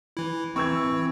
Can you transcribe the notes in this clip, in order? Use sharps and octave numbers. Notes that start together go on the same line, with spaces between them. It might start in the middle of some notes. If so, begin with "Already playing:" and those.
E3 E4
E3 C4 C#6 E6 G#6